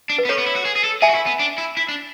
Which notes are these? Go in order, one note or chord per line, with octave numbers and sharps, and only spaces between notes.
D4
B4
B3
C#4 A4 C#5
B3
E4
F#4
G#4
G#4
A4
G#4 E5 G#5
F#4
E4
B3
D4
E4
E4
D4